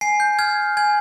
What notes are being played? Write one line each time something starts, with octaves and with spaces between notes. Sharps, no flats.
G#5 C7
G6
F6 G#6
G#5 G#6